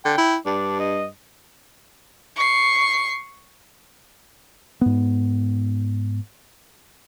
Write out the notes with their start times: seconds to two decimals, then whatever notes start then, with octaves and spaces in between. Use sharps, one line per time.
0.05 D3 G5
0.18 E4
0.46 G2 D4
0.80 D#5
2.36 C#6 C7
4.81 G#2 B3